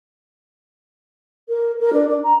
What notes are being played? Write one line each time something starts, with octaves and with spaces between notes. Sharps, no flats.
A#4
A#4
D4
D4
A#5